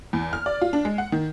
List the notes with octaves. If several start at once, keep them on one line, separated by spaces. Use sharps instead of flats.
E2
F6
D5
F4
D4
G#3
F#5
D#3